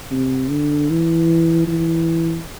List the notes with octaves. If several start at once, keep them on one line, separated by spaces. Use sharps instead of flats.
C3
D3
E3
E3